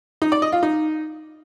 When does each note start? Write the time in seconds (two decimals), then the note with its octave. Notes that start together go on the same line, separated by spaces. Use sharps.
0.22 D#4
0.32 D5
0.42 D#5
0.52 F4
0.63 D#4